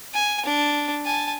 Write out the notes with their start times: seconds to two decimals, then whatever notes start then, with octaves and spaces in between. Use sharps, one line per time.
0.14 G#5
0.45 D4
1.05 G#5 A5